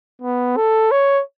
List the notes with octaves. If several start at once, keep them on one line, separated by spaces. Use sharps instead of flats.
B3
A4
C#5